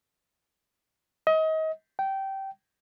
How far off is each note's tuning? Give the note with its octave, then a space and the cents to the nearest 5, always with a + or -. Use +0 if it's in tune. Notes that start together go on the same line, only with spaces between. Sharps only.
D#5 +30
G5 -15